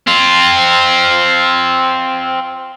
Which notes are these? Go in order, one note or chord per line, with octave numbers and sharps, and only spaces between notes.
C4 F4